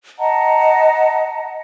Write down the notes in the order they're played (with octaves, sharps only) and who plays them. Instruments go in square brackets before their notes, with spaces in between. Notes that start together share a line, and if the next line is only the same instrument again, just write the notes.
[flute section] D#5 F#5 A5 A#5